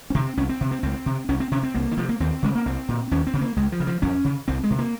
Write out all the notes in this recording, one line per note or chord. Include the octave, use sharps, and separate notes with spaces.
C#4
C3 C4
C2 C#4
C4
C3
C4
C#2 C4
C3
C2 C#4
C4
C3 C#4
C4
C2 A#3
D#3
C3 F3
A#3
D#2 C4
C#3 G#3
A#3
C2 C4
A#2
D#2 C#4
C4
C#3
A#3
C#2 G#3
F3
C#3
F3
F2 C#4
C#3
C2 C4
G#3
C3
A#3